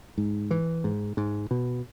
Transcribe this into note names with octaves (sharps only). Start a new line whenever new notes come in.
G#2
E3
G#2
G#2
B2